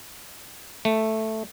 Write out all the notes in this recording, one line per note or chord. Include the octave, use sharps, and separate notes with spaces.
A3